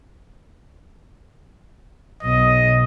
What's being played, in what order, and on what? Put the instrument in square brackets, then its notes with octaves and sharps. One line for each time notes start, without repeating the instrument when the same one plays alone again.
[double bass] B1 [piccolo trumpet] D#5